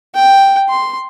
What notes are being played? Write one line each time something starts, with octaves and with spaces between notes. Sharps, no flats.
G5
C6